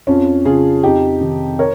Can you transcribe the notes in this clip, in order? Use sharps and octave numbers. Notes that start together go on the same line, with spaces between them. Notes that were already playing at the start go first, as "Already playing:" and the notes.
F2 C#4 F4
C#3 F4 G#4
F2 D#4 G4
C3 D#3
A#4 C#5